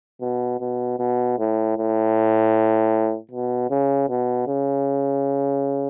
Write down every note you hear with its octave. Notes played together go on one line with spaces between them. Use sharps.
B2
B2
B2
A2
A2
B2
C#3
B2
C#3